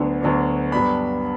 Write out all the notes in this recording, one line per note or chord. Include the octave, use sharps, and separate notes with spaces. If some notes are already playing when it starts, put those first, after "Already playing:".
Already playing: D2 D3 F#3 B3 D4
D2 D3 F#3 B3 D4
G2 F#3 B3 D4 B5